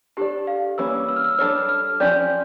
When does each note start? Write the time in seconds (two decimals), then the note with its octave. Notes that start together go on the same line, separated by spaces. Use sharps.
0.17 D4 G4 A4 D5
0.47 F5
0.78 E3 G3 A#3 C#4 E6
1.09 E6
1.16 F6
1.24 E6
1.38 G3 D4 A4 C#5 F6
1.69 F6
2.00 F3 C#4 G4 D5 G6